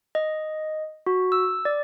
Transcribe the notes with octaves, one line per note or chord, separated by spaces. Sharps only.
D#5
F#4
E6
D5